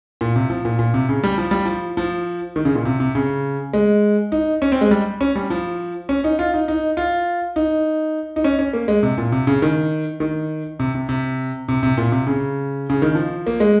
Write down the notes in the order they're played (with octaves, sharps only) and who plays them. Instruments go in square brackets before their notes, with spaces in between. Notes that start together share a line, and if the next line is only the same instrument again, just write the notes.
[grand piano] A#2
C3
F3
A#2
A#2
C3
C#3
G3
F3
G3
F3
F3
D#3
C#3
A#2
C3
C3
C#3
G#3
D#4
C#4
C4
G#3
G3
C#4
G3
F3
C#4
D#4
F4
D#4
D#4
F4
D#4
D#4
C#4
C#4
A#3
G#3
C3
A#2
C3
C#3
D#3
D#3
C3
C3
C3
C3
C3
A#2
C3
C#3
C#3
D#3
F3
A#3
G#3